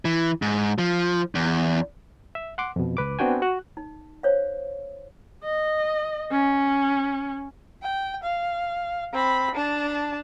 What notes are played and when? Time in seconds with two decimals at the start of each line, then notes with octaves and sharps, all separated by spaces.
0.05 E3
0.42 G#2
0.78 F3
1.35 E2
2.35 E5
2.58 F#5 C6 D6
2.76 F2 B2
2.97 C#2 B4 D6
3.19 B3 C4 D4 F#4 G5 G#5
3.42 F#4 F#6
3.77 D#4
4.23 C5 C#5 F5
5.43 D#5
6.31 C#4
7.82 G5
8.23 F5
9.13 C4 B5
9.55 D4 A5